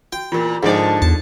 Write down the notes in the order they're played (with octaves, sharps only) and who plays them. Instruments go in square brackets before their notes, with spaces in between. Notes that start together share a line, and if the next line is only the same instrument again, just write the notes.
[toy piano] F#4 [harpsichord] G5
[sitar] E2 A#2 [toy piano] F4 G4 A#4
[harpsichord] G#2 [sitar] D3 F3 D5 [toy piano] D4 D#4
[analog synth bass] E2 [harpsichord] A5